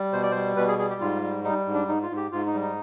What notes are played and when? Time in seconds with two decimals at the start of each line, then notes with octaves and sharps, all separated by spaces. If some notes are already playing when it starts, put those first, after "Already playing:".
Already playing: G3
0.13 B2 C5
0.22 D5
0.31 G3 C5
0.56 B2 B4
0.68 G#4
0.79 G3 G#4
0.90 G4
1.01 G#2 F4
1.22 G3
1.44 G3 D#4
1.66 G#2
1.73 D4
1.88 G#2 D#4
2.03 F4
2.10 G#2
2.17 G4
2.32 G#2 F4
2.46 D#4
2.54 G3
2.61 D#4